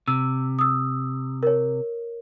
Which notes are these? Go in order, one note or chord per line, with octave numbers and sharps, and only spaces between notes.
C3 E6
D#6 E6
A#4 C#5